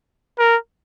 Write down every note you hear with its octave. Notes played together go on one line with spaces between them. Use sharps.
A#4